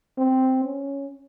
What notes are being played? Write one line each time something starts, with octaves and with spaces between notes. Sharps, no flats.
C4
C#4